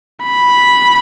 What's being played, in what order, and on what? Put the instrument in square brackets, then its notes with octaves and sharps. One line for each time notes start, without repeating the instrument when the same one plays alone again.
[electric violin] B5